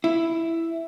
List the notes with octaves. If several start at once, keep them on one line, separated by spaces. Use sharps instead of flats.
E4